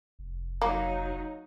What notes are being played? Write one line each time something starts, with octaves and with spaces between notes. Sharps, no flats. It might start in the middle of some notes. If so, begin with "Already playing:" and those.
F1
F#3 A#3 D#4